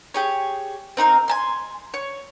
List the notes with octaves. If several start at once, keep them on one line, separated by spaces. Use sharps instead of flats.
G4 G#4 C#5
C4 D#4 A4 A#4
G#5 A5 C6
C#5